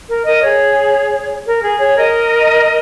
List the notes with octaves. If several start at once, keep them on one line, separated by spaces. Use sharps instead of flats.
A#4
A#4 D#5
G#4 C#5
A#4
G#4
G#4 C#5
A#4 D#5